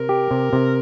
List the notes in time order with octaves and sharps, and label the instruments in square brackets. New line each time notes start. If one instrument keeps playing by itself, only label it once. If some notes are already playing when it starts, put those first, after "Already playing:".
Already playing: [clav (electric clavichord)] C3 [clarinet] A#4
[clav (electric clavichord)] G4
C3
C3